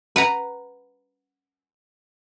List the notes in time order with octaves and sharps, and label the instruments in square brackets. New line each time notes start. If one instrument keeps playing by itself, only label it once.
[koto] B4 F#5 A#5